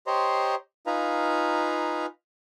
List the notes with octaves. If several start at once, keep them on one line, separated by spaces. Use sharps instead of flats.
G4 C5 C#5 D#5 A#5 C6
D#4 F4 B4 F5 G#5 A#5